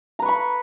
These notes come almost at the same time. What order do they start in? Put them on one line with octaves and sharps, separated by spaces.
A#5 B4 C#6 B5